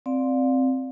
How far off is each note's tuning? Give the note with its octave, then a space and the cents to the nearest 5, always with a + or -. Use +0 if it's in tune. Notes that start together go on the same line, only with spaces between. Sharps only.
C4 +0 D5 +0 F5 +25